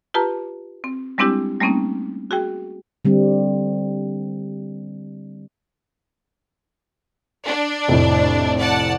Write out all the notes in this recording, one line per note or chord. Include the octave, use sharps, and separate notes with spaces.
F4 G4 B4 A5 A#5
C4
G3 G#3 C4 D4 E4 G4
G3 A3 A#3 C4 C#4 D#4
F#4 G#4 G5
D3 G3 C4
D4
F1 A2
D5 F#5 A5